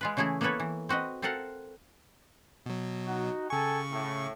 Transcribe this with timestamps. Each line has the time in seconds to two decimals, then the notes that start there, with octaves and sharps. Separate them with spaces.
0.01 G#3 F4 B4
0.17 C#3 E3 A3 E4 G#4
0.41 A#3 B3 E4 A4 B4 C#5
0.60 E3
0.89 C4 F#4 B4 D#5
1.22 C4 F4 A4 A#4 F5 F#5
2.66 B2 F#3
3.06 D#4 F#4
3.50 C#3 A4 G5 G#5 C#6
3.92 A2